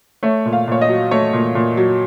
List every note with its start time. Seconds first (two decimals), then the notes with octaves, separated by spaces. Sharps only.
0.23 A3 C#5
0.46 A#2
0.53 F5
0.68 A#2 C#5
0.81 D#5
0.89 F#3
1.11 A3 C#5
1.33 A#2
1.55 A#2
1.77 F#3